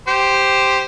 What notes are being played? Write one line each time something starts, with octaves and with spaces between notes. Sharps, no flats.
G4 C5